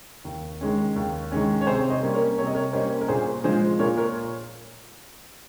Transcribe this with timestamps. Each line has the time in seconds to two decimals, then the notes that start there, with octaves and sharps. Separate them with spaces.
0.25 D#2
0.61 D#3 G#3 C#4
0.96 D#2
1.32 D#3 G#3 C#4
1.61 C#5
1.67 C3 G#4 C5
1.90 C5 D#5
2.02 G3 A#3 C#4
2.14 A#4 C#5
2.38 C3 C#5
2.47 D#5
2.55 A#4 C#5
2.73 G3 A#3 C#4 C5 D#5
3.01 A#4
3.08 A#2 G#4 C5
3.44 F3 G#3 G#4 C5
3.79 A#2 A#4 C#5
3.97 A#4 C#5